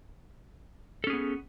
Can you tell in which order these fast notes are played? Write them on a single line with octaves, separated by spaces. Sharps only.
A4 C#4 G#4 B3